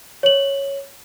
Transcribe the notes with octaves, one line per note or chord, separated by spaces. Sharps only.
C#5 F#7